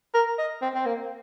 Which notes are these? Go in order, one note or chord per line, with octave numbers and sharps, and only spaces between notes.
A#4
D#5
C4
C4
A#3